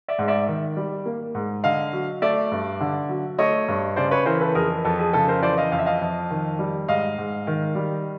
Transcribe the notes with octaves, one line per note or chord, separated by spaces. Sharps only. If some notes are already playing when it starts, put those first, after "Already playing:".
D5 E5
G#2
D5 E5
D#3
G3
A#3
G#2
D3 D#5 F5
F#3
A3 D5 E5
G2
D3
F#3
A3 C#5 D#5
G2
C#3 C5 D5
B4 C#5
E3 A#4 C5
A4 B4
F2 G#4 A#4
F2 A4
G#4
C#3 A4
A#4 C5
E3 C5 D5
D#5 F5
F2 F5
E5
D#5 F5
F2
D#3
G3
G#2 D#5 F5
G#2
D#3
G3